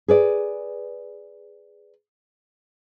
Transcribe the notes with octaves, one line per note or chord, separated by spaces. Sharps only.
G#4 B4 D5